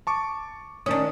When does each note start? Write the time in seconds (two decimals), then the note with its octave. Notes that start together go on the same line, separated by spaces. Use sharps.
0.07 A5 C#6 D6
0.86 D#3 C#4 D4 D#6